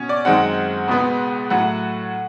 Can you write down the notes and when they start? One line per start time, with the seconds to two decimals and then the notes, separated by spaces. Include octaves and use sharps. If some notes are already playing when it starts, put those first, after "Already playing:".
Already playing: B2 C#4
0.09 D5
0.25 F#2 D#3 G#3 C4 F#5
0.88 C#2 B2 G#3 B3
1.50 A2 F#3 A3 F#5